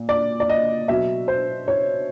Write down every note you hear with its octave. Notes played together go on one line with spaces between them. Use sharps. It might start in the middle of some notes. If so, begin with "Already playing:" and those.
Already playing: A#2
D5
D5
D#5
B2 F#3 E5
C5
C#5